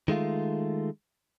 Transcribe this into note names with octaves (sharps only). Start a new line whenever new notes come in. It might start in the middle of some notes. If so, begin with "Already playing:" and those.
D#3 G#3 A3 F4